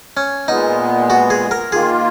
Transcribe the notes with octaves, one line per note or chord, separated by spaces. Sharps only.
C#4
A#2 G#3 B3 D#4
F#4
G#4
A#4
D#3 A#3 F4 G#4